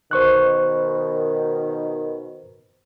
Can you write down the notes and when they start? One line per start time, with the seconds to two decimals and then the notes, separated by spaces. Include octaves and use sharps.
0.11 B2 D#3 C5 C#6 F#6